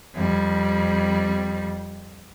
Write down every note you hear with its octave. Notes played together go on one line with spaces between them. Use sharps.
F2 G3